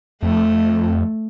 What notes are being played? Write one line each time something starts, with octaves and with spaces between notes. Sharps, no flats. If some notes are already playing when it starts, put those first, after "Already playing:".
F2 A3